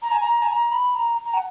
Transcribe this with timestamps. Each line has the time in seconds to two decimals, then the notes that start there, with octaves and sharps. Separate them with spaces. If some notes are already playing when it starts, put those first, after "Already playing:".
0.02 A#5
0.11 G#5
0.21 A#5
0.42 G#5
0.49 A#5
0.72 B5
0.95 A#5
1.25 A#5
1.34 F#5